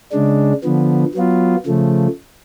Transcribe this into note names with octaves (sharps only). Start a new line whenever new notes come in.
C#3 G#3 D4
D3 F3 B3
F#3 B3 F4
C#3 F3 A3